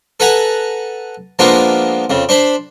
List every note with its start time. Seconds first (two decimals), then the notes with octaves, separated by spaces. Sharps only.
0.20 A4 B4 F#5 G#5 A#5
1.39 F3 G#3 A#3 B3 D4 F4
2.10 F2 C#3
2.29 D4 C5 B5